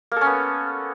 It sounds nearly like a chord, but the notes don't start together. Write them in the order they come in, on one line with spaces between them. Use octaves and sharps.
A#3 A4 C#4 B3